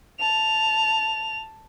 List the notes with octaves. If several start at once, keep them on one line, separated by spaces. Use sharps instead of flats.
A5 F7